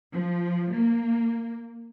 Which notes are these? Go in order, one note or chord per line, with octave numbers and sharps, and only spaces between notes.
F3
A#3